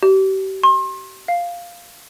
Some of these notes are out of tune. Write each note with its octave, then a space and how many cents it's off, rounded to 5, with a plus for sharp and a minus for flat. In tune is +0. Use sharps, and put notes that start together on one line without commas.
G4 -35
C6 +35
F5 +0